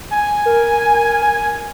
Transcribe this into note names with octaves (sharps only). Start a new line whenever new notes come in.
G#5
A#4